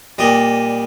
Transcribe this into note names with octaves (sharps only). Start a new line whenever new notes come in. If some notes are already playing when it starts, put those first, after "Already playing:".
A#2 G3 D#5